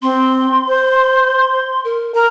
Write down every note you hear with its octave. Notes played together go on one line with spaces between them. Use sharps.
C4 C6
C5
A#4
A#4 A#5